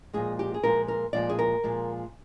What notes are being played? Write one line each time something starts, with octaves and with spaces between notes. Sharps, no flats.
A#2 F3 G#3 G#4
G4
G#4
A#2 F3 G#3 A#4
A#4
A#2 F3 G#3 D5
G#4
A#4
A#2 F3 G#3